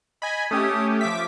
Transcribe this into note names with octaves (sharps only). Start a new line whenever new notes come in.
D#5 G#5 B5
A3 C#4 G4 D#6
F3 E5 D6 B6